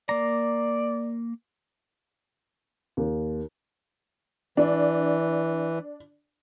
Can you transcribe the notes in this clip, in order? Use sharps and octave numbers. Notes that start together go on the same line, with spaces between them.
A#3 D5 A#5
D#2
E3 D4